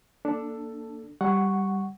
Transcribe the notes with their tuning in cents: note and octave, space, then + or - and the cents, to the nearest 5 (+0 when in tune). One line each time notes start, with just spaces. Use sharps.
A#3 +0 D4 +0 A4 +10
G3 +0 F#5 +0 C#6 +0